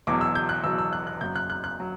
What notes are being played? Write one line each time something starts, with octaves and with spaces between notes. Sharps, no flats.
E1 E2 B2 F#3 D6
E6
G6
F#6
E1 E2 B2 F#3 E6
E6
F#6
F#6
F#1 F#2 F#3 G6
F#6
F#6
F#6
F#3